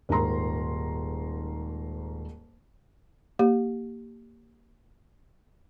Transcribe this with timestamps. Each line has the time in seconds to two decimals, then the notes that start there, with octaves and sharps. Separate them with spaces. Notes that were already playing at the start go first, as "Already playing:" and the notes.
0.09 D#1 G#2 A#4 A#5 C6
3.39 A#3 G4